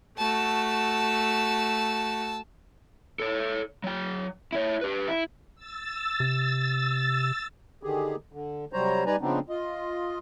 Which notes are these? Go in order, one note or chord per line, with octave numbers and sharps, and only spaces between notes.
A3 F#4 A5 E6
A4 C#5
F#3 G5
E4 C#5
G4 B4
E4
E6 A6
C3
D3 D#3 G4 G#4
D3
C3 F#3 G3 C5 C#5 A#5
G3 D#4 B4 D5 G#5 A#5
C#3 F3 B3 C4 D4 D#4
F4 D#5